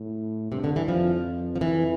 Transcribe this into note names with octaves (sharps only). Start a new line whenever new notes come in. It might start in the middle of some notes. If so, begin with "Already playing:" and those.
Already playing: A2
G2 C3
D3
E3
F2 F3
F3
F2 E3